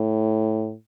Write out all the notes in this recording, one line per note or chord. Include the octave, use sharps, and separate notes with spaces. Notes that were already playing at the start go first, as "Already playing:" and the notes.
Already playing: A2